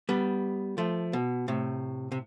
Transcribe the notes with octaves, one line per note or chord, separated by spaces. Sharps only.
G3 B3
F3 A3
B2
A2 C3
C3